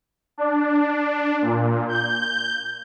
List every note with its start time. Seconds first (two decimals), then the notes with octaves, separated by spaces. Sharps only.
0.38 D4
1.42 A#2
1.89 G6